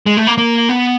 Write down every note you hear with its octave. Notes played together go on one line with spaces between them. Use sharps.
G#3
A3
A#3
A#3
B3